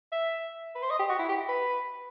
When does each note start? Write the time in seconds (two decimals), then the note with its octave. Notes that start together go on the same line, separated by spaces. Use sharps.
0.12 E5
0.75 B4
0.82 C5
0.90 D#5
0.99 G4
1.09 F#4
1.19 E4
1.29 G4
1.48 B4